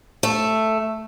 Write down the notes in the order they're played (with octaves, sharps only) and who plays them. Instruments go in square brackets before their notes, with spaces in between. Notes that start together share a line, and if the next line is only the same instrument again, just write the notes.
[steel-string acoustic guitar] A3